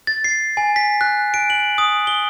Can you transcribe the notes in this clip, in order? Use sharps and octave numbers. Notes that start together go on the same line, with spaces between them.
A6
C7
G#5
B6
F#6
D7
F#7
D#6
G7